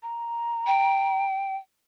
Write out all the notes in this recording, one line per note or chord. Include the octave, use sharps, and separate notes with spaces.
A#5
G5